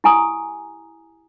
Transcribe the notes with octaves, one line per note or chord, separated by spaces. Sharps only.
E4 G4 G#5 A#5 D#6